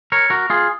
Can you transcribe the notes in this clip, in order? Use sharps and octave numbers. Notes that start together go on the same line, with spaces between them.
A#4 C#5
F#4 A#4
F4 G#4